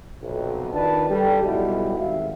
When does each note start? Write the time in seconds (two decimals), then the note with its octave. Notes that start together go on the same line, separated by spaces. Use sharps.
0.22 B1 F2 C3
0.73 D#3 D4 F4 B4 D5 A5
1.09 G3 G4 A4
1.44 B1 G3 G#3 E4 F#4
1.98 G#1 E5 F5